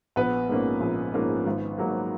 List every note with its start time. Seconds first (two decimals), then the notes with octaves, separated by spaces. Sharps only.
0.16 A#1 B3 B4
0.49 G#2 F3 A#3 C#4
0.81 A#1
1.14 G#2 F3 A#3 C#4
1.47 G#1
1.78 G#2 F#3 A#3